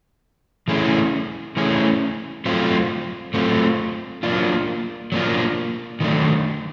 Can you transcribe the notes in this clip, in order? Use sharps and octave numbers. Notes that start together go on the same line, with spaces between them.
E3 A3 C#4 E4 G#4
E3 A3 C#4 E4 G#4
F#3 A3 C4 F4
F#3 A3 C4 F4
F#3 A#3 D4 F4
F#3 A#3 D4 F4
D#3 F#3 A3 D4